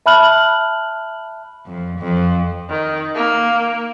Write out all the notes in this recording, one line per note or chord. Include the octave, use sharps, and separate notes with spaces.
E5 A5 B5 F6 F#6 F#7
F2
F2
D#3
A#3